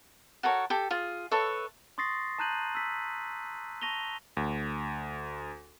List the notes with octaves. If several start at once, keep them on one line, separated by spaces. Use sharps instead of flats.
F#4 A4 A#4 C#5
G4 A4
F4 G#4
A4 B4 C#5 E5
C6 C#6 D#6 A6 A#6 C7
A5 A#5 F#6 G6 D#7 F#7
E6 B6
A5 C#6 A#6 D#7 F7 G7
D2